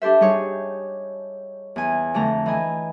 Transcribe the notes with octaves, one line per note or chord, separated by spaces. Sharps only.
D4 G4 A4 C5 E5
G3 D#4 G#4 C#5
E2 G#5
F2 D3 A3 A#5
E3 D#5 G#5